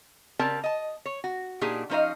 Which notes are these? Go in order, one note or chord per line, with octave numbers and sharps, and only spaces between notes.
C#3 C4 G4 A#4 D5 A5
D#5 A5
C#5
F#4
A#2 D4 D#4 G4 G#4
F3 C#4 D#4 C5 D#5 F5